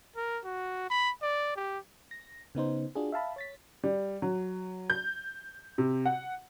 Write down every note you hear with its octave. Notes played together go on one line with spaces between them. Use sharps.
A#4
F#4
B5
D5
G4
A#6
C#3 B3 D#4 C5
D4 F4 F#4 G#4
E5 F5 A5 B5
C#5 A6 B6
G3
F#3
G6
C3
F#5